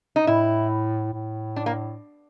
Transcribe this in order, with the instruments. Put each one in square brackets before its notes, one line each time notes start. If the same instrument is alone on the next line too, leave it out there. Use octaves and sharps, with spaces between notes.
[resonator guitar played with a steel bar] D#4
[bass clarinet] A2 [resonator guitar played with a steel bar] E4
[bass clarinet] A2
[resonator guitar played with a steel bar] D4
A#3